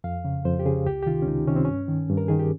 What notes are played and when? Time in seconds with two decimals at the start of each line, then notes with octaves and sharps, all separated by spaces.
0.04 F2 F5
0.25 C#3
0.45 F2 C5
0.59 G4
0.66 C#3 G#4
0.86 C#2 G4
1.02 G4
1.06 C3 D#3 F4
1.22 C#4
1.27 C#2 D#4
1.47 C3 D#3 C#4
1.56 C4
1.65 G2 C#4
1.88 D#3
2.09 G2
2.17 A#4
2.28 D#3 G#4
2.39 G4